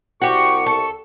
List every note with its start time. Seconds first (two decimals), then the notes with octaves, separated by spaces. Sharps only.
0.22 C2 F#4 G4 C#6
0.66 A4